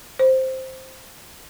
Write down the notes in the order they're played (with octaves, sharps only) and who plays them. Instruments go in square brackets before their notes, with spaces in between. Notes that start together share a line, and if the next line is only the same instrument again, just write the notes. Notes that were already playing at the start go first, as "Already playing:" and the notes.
[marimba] C5